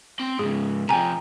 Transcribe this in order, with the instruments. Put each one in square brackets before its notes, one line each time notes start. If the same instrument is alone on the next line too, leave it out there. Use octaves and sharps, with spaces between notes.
[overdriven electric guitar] C4 C6
[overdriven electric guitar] G#2 C#3 [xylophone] G#4
[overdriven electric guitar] C3 F3 [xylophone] G5 G#5 A#5